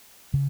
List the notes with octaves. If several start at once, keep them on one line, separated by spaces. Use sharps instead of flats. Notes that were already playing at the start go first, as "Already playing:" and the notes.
C#3